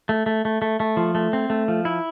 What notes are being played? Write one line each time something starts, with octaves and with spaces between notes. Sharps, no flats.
A3
A3
A3
A3
A3
F3
A3
C4
A3
F3
E4